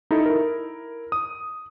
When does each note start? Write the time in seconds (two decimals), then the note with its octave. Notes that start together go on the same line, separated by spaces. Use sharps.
0.11 D#4 E4 A4
0.26 E4 A#4
1.12 D#6